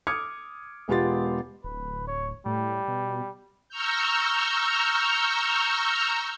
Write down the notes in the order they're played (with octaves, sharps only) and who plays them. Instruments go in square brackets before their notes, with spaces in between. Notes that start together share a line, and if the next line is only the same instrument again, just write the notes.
[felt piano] D6 D#6 F6 G#6 C#7
E1 G#3 B3 F4 G4 A6
[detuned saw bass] D1 [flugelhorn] B4
[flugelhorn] C#5
[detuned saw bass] A2 [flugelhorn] G3
[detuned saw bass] B2
[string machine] A#5 C#6 E6 F6 G6